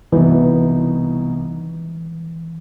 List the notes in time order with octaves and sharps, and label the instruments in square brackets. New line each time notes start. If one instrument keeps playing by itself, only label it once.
[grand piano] C2 B2 G3 B3 D#4 [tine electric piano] E3